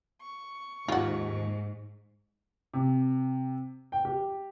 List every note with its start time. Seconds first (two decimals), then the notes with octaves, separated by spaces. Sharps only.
0.21 C#6
0.88 D#2 G#2 F4 F#4
2.74 C3
3.92 G5
4.05 G4